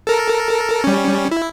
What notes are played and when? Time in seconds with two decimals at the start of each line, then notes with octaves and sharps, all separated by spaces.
0.07 A4 A#4
0.84 G3 C#4
1.31 E4